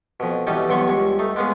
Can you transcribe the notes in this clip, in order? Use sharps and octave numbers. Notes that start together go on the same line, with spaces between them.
F2 B2
B2 E3 G3 C#4 D#4 A4
G2 B2 F#3 B3 C6 C#6
C#2 G2 C#6
A3 D#4
G#3 A#3 B3 C#4 G#4